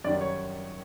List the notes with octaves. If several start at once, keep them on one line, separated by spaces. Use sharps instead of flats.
F#2 D#3 G3 D5
C#5